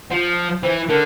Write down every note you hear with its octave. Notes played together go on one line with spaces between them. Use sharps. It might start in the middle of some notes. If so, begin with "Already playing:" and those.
F3
E3 C5
D3 A#4